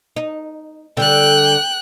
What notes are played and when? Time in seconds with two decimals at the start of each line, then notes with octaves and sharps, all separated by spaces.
0.16 D#4
0.97 D3 G3 G5 F#6